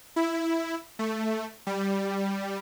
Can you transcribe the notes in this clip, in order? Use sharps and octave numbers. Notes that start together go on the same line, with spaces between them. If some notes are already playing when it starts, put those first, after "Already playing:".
E4
A3
G3